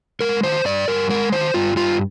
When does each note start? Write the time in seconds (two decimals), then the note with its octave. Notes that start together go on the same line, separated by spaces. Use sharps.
0.20 G#3 A#4
0.43 D#3 C5
0.65 G2 D5
0.88 G2 A#4
1.10 G#3 A#4
1.32 D#3 C5
1.54 G2 F4
1.76 G2 F4